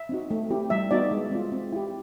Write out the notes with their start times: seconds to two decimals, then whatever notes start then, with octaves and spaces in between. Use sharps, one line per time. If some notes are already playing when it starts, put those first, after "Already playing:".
Already playing: E5
0.09 C4 D#4 F#4
0.31 A3
0.50 C4 E4 G4
0.70 G3 E5
0.91 B3 D#4 F#4 D5
1.11 G#3
1.31 C4 F4
1.52 C4
1.72 E4 G4